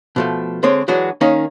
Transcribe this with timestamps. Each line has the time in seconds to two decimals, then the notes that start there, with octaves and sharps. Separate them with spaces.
0.16 B2 F3 A3
0.63 D3 G#3 C4 C#5
0.88 E3 F#3 G#3 D4 F#4
1.21 D#3 A#3 C#4 D#4